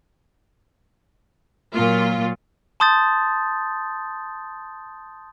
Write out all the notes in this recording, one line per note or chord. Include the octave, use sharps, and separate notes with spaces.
A#2 F#3 A#3 F4
A5 C6 D#6 G6 A6